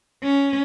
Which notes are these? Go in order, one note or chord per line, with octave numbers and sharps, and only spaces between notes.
C#4